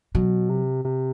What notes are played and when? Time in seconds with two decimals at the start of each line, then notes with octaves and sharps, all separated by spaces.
0.15 B2 F#3
0.49 C3
0.85 C3